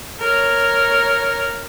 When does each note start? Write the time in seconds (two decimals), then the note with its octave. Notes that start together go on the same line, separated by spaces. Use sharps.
0.20 A#4 C#5